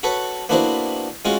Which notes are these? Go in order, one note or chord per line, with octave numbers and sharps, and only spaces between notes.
F#4 A4 B4 C#5
A#3 B3 D4 E4 F#4 C5
G#3 C#4 F4 F#4